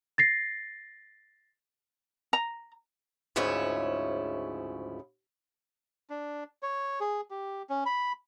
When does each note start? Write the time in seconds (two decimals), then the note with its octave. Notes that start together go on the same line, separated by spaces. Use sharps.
0.18 A6 A#6 C7
2.33 A#5
3.36 D2 G#2 C#3 F3 E4 C#5
6.10 D4
6.63 C#5
7.00 G#4
7.31 G4
7.70 C#4
7.86 B5